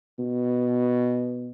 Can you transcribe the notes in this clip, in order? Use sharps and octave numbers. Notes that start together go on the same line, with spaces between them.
B2